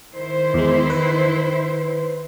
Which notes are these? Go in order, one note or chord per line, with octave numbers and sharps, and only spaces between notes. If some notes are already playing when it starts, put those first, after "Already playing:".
D#3 E4 C5
E2 G#3
B4